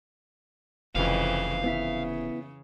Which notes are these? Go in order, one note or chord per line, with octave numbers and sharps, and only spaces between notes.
F1 F2 C#3 E3 F5
C#3 B3 E4 E5